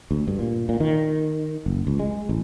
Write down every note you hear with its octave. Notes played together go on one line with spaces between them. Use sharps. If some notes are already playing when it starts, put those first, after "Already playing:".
D2
G2
A#2
A#2
D#3
F#1
C#2
G#3
A1